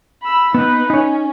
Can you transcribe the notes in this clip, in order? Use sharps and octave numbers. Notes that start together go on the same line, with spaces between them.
B5 E6
B3 D#4 B4
C#4 D#4 C#5